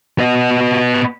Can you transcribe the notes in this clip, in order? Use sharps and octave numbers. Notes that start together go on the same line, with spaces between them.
B3 D#5